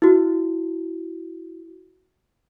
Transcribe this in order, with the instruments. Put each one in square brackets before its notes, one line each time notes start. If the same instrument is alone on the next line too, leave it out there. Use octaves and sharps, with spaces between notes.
[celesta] E4 F#4